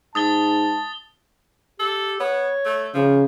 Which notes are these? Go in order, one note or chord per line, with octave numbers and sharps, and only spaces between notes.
G#2 A5 D#6 A6 G7
G4 A4
B3 C#5
A3
C#3 F3